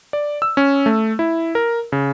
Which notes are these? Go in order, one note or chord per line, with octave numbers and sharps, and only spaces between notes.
D5
E6
C#4
A3
E4
A#4
C#3